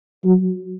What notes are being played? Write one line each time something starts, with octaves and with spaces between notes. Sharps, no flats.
F#3